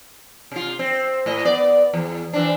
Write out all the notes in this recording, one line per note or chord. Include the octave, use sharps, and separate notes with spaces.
C3 F4
C4
A2 D#5
B3 D5
E2
E3 C4 D4